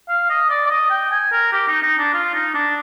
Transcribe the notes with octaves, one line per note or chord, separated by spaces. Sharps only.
F5
D#5
D5
D5
D#5
G5
G#5
A#4
G4
D#4
D#4
D4
F4
D#4
D4